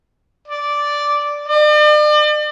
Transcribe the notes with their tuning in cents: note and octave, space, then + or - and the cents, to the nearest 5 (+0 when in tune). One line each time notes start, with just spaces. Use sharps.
D5 -5
D5 +40